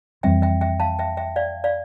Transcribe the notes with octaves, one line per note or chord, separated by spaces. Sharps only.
F2 E3 G3 C4 E5 G5
E5 G5
E5 G5
F5 A5
E5 G5
E5 G5
D5 F5
D5 F5